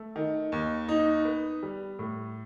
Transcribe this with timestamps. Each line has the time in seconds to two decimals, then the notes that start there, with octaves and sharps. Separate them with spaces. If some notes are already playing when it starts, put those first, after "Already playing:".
Already playing: A3
0.16 D#3
0.52 D#2
0.89 D#4
1.25 B3
1.63 G3
1.99 A2